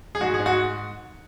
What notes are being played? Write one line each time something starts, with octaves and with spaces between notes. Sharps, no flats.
G#4
G#2 F#4
G#4
G#2
F#4